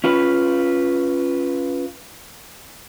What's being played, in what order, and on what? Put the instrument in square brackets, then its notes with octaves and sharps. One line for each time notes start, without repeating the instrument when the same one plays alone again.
[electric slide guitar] C#4 F4 B4